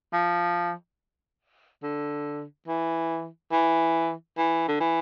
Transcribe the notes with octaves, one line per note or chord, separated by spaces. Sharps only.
F3
D3
E3
E3
E3
D3
E3